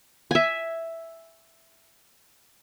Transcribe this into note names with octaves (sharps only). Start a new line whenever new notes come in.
E5 G#5